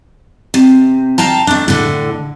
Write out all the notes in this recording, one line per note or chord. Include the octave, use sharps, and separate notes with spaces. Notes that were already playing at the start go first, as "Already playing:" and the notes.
C3
F5 G5 A5 A#5
A3 D4
A2 D3